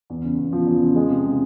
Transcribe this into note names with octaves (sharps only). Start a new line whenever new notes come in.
E2
C#3
E2
F3
E2
C#3
G#3
C3